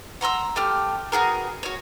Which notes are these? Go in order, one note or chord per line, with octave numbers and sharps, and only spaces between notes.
F#5 A#5 C6 E6
A3 G4 F6
B3 F#4 G#4 A#4
F#4 C#5